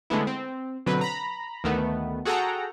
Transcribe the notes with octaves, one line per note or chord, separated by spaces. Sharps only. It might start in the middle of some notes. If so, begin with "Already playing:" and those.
D3 G#3 A3 B3 E4
C4
B2 D3 F#3 C4 B4
A#5 B5
D2 D#3 A3 B3
F#4 G#4 A4 F#5 G5 A#5